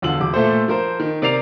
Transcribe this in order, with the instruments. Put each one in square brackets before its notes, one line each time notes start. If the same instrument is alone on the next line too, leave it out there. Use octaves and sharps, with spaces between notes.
[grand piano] E1 E2 D3 F4 E6 F#7
E1 D6
A#2 A3 A4 C5
F3 A#4 C5
D#3
C3 A#4 D5 C7 F7